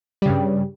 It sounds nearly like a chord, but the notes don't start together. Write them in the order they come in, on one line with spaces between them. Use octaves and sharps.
G3 C#3 G2